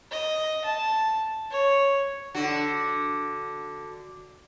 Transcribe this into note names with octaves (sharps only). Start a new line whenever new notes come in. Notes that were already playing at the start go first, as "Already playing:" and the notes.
D#5
A5
C#5
D3 F#4